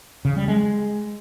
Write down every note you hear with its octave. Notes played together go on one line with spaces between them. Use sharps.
C#3
G3
G#3